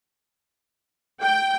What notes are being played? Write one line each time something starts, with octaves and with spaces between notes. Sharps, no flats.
G5